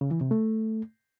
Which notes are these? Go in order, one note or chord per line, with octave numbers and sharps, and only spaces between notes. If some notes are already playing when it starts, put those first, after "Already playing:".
C#3
E3
C3
A3